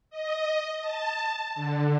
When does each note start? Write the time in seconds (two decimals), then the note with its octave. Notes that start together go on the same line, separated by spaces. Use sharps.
0.10 D#5
0.82 A5
1.55 D3